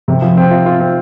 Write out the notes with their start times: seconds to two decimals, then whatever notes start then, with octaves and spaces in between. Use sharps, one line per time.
0.08 C3
0.22 F3
0.37 C4
0.51 F4
0.66 F4
0.80 C4